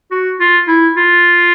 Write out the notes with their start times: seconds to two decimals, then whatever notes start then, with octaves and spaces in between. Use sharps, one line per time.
0.11 F#4
0.40 F4
0.68 E4
0.97 F4